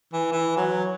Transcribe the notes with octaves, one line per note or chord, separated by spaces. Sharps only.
E3
E3
F#3